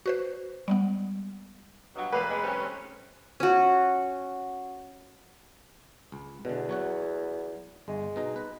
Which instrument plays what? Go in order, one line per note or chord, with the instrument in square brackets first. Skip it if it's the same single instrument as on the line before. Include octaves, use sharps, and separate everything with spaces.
[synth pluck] F#4 B4 C5
G3 G#3 B3
[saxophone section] G2 B2 F#3
[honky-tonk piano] F1 B4 [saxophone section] A#3 B3
[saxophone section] G#3
G3 C4 C#4
[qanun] C#4 F#4
[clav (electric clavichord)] C#2
[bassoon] E2 [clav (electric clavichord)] B2 D3
[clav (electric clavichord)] F#3 C#5 F#5
[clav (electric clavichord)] G1 [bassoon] G#3
[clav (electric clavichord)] B2 D#4 A#5
B4